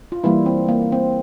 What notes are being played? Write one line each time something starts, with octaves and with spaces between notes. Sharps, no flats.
F4
E3 G3 A#3 E4
C4
A#3
C4